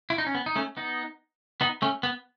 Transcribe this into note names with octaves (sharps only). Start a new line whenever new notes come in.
E4
D#4
C#4
B3
D#4
A3 C#4
B3 D#4
B3 D#4
A3 C#4
B3